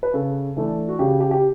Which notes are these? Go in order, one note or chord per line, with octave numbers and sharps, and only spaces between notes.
B4
C#3 A4
E3 A3 D4
F#4
C#3 G4
G4
G4